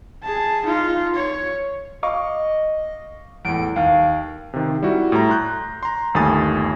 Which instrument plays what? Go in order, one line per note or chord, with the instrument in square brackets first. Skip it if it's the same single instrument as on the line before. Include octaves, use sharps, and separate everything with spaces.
[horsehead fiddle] G#4 A5
D#4 F4
C#5
[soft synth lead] D#5 [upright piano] F5 C#6 D6
[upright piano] E2 A2 [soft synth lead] D7
[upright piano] D#2 [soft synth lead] F5
[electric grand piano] C3 D#3
G3 E4 F#4
A2 A#5
A#5 C6 F#6 G6
A#5 C6
G1 D#2 A3 G#5 D#6 A6